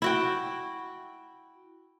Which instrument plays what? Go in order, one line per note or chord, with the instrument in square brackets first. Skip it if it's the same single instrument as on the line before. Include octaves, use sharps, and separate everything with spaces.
[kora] E4 F#4 G5